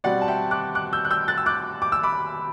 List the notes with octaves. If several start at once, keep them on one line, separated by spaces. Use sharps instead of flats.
B2 G3 C4 D5 F#5
A5
E5 G5
D6 F#6
D6 F#6
E6 G6
F#6
E6 G6
F#6 A6
E6
D6 F#6
D6
E6
B5 D6